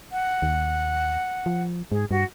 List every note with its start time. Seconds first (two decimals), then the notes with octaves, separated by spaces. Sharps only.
0.12 F#5
0.42 D#2
1.46 F3
1.92 G#2 G#4
2.11 G2 F#4